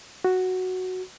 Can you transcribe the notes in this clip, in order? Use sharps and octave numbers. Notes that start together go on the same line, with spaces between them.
F#4